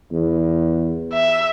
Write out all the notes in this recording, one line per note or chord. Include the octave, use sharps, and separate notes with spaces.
E2
E5